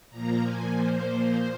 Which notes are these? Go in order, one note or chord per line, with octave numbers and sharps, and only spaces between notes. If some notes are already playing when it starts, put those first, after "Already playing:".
A#2 F3 A#3 A#5
G#5
C5